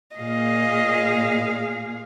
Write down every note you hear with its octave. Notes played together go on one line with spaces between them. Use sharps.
A#2 G#4 D#5 F5